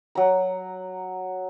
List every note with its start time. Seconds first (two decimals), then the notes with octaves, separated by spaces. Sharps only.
0.15 F#3 A#5